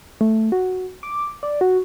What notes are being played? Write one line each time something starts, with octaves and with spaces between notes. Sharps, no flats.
A3
F#4
D6
D5
F#4